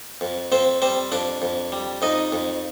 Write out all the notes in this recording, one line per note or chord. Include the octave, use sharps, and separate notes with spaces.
F2
F2 C4 C5
G3 C4 C5
F2 D4 D5
F2
G3
F2 D#4 D#5
F2